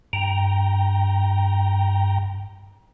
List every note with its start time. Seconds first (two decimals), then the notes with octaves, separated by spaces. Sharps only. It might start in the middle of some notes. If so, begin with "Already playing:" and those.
0.13 G2 G5 A#5